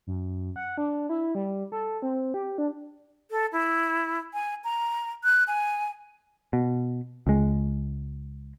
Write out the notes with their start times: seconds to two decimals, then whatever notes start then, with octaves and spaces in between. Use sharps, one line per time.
0.07 F#2
0.56 F#5
0.78 D4
1.09 E4
1.35 G3
1.72 A4
2.02 C4
2.34 G4
2.58 D4
3.31 A4
3.52 E4
4.34 G#5
4.64 A#5
5.24 F#6
5.47 G#5
6.53 B2
7.27 C#2 G#3